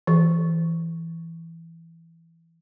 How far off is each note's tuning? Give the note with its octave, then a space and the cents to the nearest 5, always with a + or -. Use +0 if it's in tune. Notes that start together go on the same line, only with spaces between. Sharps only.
E3 +5